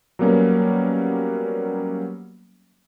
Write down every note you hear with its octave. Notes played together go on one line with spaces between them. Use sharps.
F#3 G3 A#3 B3 C#4